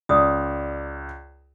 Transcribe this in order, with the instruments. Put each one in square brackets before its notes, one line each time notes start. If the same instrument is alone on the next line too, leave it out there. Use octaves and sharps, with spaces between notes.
[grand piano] C#2 [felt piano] D5 [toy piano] D#6